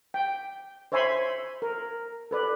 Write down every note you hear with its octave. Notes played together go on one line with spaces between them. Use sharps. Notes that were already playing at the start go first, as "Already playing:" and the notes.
G5
C5 C#5 E5 G#5 B5 C6
A#4
A4 B4 D5